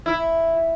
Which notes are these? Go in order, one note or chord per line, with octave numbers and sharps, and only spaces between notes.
E4